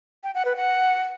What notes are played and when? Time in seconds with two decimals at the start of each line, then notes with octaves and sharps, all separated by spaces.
0.24 G5
0.34 F#5
0.45 B4
0.56 F#5